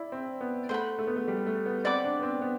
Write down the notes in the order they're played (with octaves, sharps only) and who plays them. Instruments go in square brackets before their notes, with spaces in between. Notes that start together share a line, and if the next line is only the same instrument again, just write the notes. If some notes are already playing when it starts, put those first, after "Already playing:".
Already playing: [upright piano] E4 [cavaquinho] D5
[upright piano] C4
B3
[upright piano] A3 [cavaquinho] C5 F#5 B5
[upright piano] A3
B3
A3
G3
A3
B3
[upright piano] C4 [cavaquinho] D5 F#5 B5 D6
[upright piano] D4
B3
C4
B3